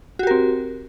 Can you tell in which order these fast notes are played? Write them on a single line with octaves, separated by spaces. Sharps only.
F#4 G4 A#4 C4